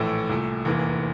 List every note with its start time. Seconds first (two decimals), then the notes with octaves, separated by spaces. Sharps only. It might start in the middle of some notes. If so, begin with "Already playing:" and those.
Already playing: A#1 A2 E3 A3
0.29 C2 A#2 A3
0.65 F1 E2 E3 A#3